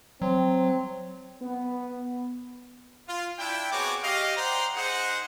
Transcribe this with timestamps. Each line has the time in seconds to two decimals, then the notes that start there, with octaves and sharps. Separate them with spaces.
0.22 F#3 C4
1.42 B3
3.08 F4
3.39 D4 E4 G5
3.72 B3 C4 F#4 G#4 C#5 D6
4.04 G4 D#5 F5
4.36 C5 D5 F#5 G5 A#5
4.76 D#4 G#4 C5 F#5